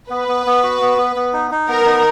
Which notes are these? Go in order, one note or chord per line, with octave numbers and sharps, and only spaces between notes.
B3 B4
B3
B3
F#4
B3
B3
B3
D#4
D#4
B3 A#4
D#4